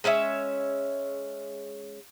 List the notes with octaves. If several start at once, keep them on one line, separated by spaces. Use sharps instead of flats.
G#3 C#4 C#5 E5